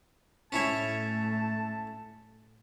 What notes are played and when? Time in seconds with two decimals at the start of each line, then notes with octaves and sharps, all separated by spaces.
0.52 A2 A3 C#4 E4 C#5 A5